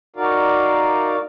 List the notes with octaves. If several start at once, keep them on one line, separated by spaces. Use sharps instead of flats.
D#4 F#4 A#4 D5 F5